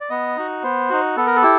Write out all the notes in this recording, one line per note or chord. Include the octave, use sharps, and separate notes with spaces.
D5
B3 D#5
D#4 F#4
B3 C5
D#4 F#4
B3 A4
A#4
A4
E4 G4